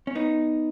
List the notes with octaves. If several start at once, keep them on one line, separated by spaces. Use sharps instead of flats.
C#4
B3 D#4